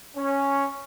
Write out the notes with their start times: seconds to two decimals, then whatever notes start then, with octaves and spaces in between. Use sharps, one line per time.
0.17 C#4